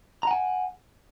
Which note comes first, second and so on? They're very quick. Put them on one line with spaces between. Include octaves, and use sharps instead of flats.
A#5 F#5 G#5